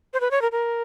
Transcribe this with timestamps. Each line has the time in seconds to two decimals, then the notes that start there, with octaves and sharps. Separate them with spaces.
0.13 C5
0.20 B4
0.31 C#5
0.41 A#4
0.52 A#4